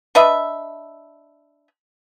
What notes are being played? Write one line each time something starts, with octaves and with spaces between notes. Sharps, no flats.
D4 B4 D#5 E5